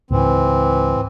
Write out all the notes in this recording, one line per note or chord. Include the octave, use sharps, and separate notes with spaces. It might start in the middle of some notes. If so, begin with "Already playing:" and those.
C#2 G#2 E3 C4